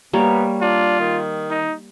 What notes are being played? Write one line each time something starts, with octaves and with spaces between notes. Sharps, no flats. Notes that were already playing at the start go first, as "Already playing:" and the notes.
G3 A#3 B3 C#5
D4 F4
D#3
D#4